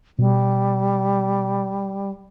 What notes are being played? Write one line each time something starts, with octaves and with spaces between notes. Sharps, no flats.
B2 G3